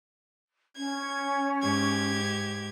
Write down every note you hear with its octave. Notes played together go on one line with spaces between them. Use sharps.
C#4 G#6
G#2 G4 G#6